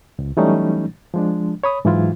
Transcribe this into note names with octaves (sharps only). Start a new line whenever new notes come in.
C#2
E3 F#3 G3 A3 C#4 D#4
F3 G#3 D4
C#5 B5 D#6
G#2 E3 F#3 E4 F4